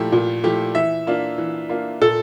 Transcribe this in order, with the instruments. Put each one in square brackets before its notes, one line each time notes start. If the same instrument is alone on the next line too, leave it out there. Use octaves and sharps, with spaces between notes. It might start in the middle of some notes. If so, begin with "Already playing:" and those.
Already playing: [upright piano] A#2 F3 A3 E4 G4
A#2
F3 A3 E4 G4
[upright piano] E3 [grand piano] E5
[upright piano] A#3 D4 F4
E3
A#3 D4 F4
[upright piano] A#2 [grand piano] A4